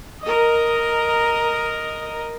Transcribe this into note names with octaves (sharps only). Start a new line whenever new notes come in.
A#4 D#5